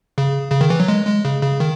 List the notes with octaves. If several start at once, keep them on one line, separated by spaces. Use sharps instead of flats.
C#3
C#3
D#3
E3
F#3
G#3
G#3
C#3
C#3
D#3